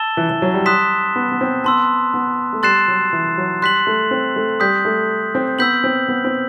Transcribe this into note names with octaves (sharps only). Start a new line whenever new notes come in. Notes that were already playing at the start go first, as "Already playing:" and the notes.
Already playing: A5 E6 A6 E7 G7
E3
E3
F#3
G3
C6 D#6 F#6 B6 E7
B3
B3
C4
B3 A5 C6 E6
B3
A3
G3 C6 F#6 A6 C7 E7
F#3
E3
F#3
G3 C6 F#6 B6 F#7
A3
C4
A3
G3 D#6 G6 B6
A3
C4
B3 E6 G6 B6 F#7
C4
B3
C4